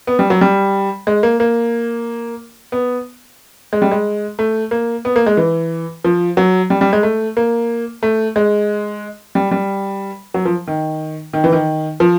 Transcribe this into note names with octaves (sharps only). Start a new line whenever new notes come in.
B3
G3
F#3
G3
G#3
A#3
A#3
B3
G#3
G3
G#3
A3
A#3
B3
A#3
G#3
E3
F3
F#3
G3
G3
G#3
A3
A#3
A3
G#3
G3
G3
F#3
F3
D#3
D#3
E3
D#3
F3